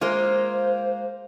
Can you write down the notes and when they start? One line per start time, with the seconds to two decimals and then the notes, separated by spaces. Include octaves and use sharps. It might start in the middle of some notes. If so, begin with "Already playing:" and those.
0.01 G#3 A#3 F4 C5